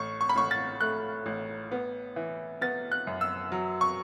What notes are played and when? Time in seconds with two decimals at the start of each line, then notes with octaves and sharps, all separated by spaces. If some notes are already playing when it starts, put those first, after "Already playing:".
Already playing: A1 C#6
0.21 C#6
0.29 B5
0.36 A1 C#6
0.51 A6
0.81 A3 F#6
1.26 A1
1.72 B3
2.16 E3
2.61 B3 A6
2.92 F#6
3.07 F#2
3.21 E6
3.52 F#3
3.81 C#6